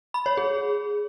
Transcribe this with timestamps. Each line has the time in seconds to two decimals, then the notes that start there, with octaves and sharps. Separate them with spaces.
0.14 B5
0.26 C#5
0.37 G#4